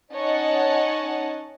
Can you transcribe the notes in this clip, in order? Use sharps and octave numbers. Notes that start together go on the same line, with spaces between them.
C#4 D#4 C#5 D#5 F#5 A5